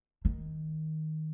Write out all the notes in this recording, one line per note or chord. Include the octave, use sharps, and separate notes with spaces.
D#3